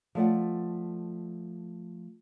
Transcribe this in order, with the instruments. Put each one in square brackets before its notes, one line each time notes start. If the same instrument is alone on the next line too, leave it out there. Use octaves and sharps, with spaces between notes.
[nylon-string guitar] F3 A3 D5 F#5